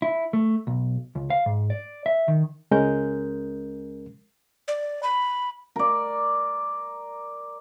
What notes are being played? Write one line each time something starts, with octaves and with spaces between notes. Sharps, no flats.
E4
A3
B1
C#2
F5
G#2
D5
E5
D#3
C#2 G#3 C#4 A#4 G6
D5
B5
A#4 D5